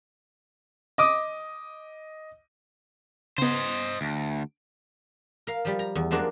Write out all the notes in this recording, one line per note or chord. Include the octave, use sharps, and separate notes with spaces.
D#5 D6 D#6
C#3 B3 C5 D#5
D2 D7
A#4 F5
F3 G3
A#5
E2
F3 G#3 A#3 D4 F#4